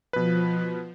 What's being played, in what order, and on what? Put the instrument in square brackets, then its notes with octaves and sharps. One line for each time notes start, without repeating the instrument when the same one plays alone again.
[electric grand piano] B2 B4 [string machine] F3